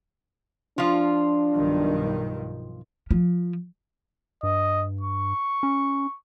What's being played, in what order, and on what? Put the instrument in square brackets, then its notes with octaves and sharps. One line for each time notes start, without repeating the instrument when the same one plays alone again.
[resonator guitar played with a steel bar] F3 F4 [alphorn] D4
[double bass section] B1 G2 D#3
[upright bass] F3
[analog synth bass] G2 [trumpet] D#5
[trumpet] C#6
[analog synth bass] C#4